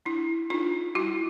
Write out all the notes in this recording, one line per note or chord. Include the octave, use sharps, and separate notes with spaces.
D4 E4
D4 D#4 F4
G3 E4 F#4